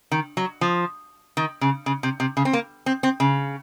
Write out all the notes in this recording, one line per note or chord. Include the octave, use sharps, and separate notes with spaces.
D#3
F#3
F3
D#3
C#3
C#3
C3
C3
C#3
C4
A#3
C4
C4
C#3